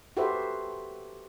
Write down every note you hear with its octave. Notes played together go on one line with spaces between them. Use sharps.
F#4 G4 A4 B4 C5 E5